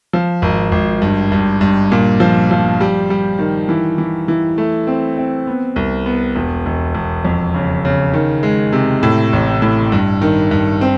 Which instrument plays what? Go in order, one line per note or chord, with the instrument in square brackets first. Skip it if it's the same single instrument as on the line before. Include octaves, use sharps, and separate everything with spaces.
[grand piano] F3
G#1
G#1
G2
G2
G2
A#2
F3
F3
G3
G3
D#3
E3
E3
E3
A3
C4
C4
B3
C2
B3
E1
E1
E1
F2
C#3
C#3
D#3
G#3
C3
A2
A1
A2
G2
D#3
G2
C4